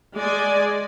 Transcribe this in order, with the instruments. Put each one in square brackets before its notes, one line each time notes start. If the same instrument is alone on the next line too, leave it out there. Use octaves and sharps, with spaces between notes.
[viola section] G#3 D5 G#5